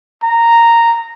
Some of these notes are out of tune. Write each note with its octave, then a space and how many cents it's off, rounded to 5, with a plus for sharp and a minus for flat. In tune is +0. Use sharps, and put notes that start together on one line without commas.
A#5 -10